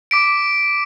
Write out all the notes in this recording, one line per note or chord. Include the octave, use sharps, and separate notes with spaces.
D6 B6 D7